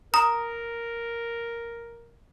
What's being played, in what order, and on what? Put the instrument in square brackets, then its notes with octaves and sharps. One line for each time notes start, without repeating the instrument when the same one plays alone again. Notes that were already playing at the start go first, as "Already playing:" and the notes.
[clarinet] A#4 [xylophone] A#5 [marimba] D#6